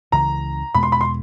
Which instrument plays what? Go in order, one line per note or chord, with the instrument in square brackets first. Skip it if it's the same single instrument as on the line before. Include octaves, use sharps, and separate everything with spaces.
[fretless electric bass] C#2 C#3 E3 [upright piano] A#5
[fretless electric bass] E2 B2 G#3 B3 [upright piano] B5
[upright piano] C6
B5
C6